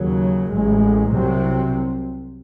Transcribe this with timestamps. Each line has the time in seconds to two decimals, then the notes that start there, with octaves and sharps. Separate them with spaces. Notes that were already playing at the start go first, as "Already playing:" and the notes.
Already playing: D#2 C#3 F#3
0.50 A1 A2 G#3
1.11 C2 C3 F#3 C4